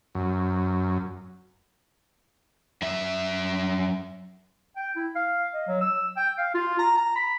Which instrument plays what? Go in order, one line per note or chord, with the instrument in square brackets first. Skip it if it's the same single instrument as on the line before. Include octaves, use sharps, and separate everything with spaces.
[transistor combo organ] F#2
[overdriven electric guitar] F#2 E5
[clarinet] G5
E4
F5
D#5
F#3
E6
G5
F5
F4
A#5
A#5
B5